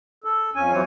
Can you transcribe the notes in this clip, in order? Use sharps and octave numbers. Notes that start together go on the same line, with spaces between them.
A4
F2 C#4 G#5
E3 F#3 C4 C#5